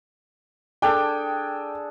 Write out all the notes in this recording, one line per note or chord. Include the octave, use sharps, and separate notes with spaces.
D4 G#4 A4 G5